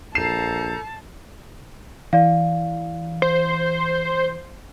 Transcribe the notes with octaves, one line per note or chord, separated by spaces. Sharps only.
A#1 A4 A5 A#5 G6 C7 E7
E3 D5 F5
C5